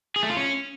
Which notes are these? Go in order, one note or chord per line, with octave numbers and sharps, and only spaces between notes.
G#4
A3
F4
C#4